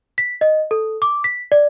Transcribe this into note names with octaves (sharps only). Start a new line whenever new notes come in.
B6
D#5
A4
D6
B6
D5